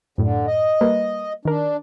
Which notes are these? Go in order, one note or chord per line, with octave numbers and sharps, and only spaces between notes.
F#2 A2 D3
D#5
G3 A#3 B4
D#3 D4 A#4